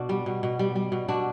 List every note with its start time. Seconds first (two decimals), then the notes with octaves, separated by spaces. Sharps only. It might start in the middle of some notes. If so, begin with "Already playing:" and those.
Already playing: B2 D4 F#4
0.09 G3
0.26 B2
0.43 B2
0.59 G3
0.76 G3
0.92 B2
1.08 B2 D4 F#4